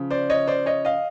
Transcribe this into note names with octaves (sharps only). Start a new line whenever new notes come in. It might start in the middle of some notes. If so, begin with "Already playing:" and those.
Already playing: C#3 F3
C5 D5
C#5 D#5
C5 D5
C#5 D#5
D#5 F5